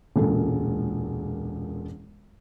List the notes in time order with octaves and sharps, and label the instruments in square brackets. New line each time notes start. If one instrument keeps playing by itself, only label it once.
[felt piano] E1 C#2 A#2 A4